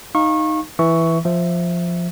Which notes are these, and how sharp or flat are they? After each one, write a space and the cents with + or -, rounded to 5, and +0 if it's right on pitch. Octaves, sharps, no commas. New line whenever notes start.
D#4 +0 F5 +0 C#6 -30
E3 +0 E5 +0 C#6 +10
F3 +0 E5 +0